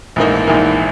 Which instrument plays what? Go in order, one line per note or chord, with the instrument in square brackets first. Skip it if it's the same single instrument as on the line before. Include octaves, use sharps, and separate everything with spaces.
[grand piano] A#1 G#2 E3 A#3 D#4
A#1 G#2 E3 A#3 D#4